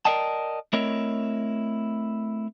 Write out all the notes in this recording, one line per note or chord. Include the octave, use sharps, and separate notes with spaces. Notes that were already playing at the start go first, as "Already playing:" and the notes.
A#4 B4 D5 D#5 G5 A5
A3 C4 E4 A#4 C#5 D#5